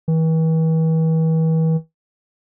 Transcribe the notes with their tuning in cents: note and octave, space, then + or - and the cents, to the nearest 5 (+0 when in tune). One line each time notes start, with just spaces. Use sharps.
E3 -40